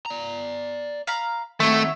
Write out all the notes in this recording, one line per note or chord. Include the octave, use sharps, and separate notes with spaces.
D5 A#5
F5 A#5 B5
D#3 A3 C4 F#4 C#5 E5